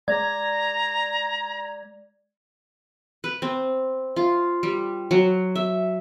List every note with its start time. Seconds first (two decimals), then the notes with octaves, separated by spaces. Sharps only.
0.08 G#3 D5 A#5 G#6
3.24 B4
3.42 C4
4.16 F4
4.63 G3
5.11 F#3
5.55 E5